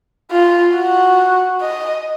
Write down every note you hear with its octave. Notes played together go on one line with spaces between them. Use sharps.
F4
F#4
D#5